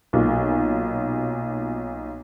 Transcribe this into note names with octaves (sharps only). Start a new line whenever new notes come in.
B1 A#2